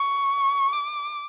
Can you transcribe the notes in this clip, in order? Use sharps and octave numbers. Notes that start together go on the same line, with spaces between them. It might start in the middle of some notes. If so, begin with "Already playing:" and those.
Already playing: C#6
D6